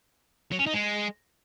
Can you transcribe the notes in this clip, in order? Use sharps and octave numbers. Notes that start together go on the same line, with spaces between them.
F#3
C#4
D#4
G#3